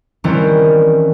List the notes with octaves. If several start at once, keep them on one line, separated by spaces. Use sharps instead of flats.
D#3 E3 G3 C4 C#4 E4